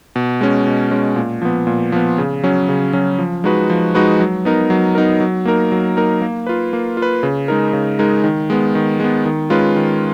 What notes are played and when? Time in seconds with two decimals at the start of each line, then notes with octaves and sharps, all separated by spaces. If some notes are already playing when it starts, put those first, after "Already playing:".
0.16 B2
0.41 G#3 C#4
0.67 B2
0.91 G#3 C#4
1.16 A#2
1.42 F3 B3
1.67 A#2
1.92 F3 B3
2.18 C#3
2.43 F#3 C#4
2.69 C#3
2.93 F#3 C#4
3.18 F3
3.44 G#3 D#4 F#4 B4
3.70 F3
3.95 G#3 D#4 F#4 B4
4.20 F#3
4.45 B3 D#4 A#4
4.70 F#3
4.95 B3 D#4 A#4
5.20 F#3
5.45 A#3 D#4 A#4
5.72 F#3
5.97 A#3 D#4 A#4
6.22 A#3
6.47 F4 B4
6.73 A#3
6.97 F4
7.02 B4
7.23 C#3
7.48 G#3 D#4 A#4
7.73 C#3
7.99 G#3 D#4 A#4
8.24 D#3
8.50 G#3 B3
8.75 D#3
9.00 G#3 B3
9.25 D#3
9.50 G#3 C#4 F4 B4
9.76 D#3